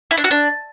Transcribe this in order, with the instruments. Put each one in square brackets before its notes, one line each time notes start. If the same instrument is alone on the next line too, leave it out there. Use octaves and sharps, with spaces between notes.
[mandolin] E4
D4
F#4
D4